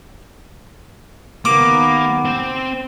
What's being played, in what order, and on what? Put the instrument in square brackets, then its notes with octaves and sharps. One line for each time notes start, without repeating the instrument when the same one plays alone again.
[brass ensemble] D#2 B3 [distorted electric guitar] A#3 [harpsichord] D6
[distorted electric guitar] C4 C5